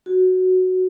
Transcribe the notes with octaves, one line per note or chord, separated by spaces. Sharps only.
F#4